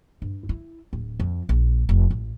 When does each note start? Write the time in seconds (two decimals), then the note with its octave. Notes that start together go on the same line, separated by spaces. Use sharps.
0.22 G2
0.49 E4
0.93 D1
1.20 F2
1.49 A#1
1.89 F1
2.11 A1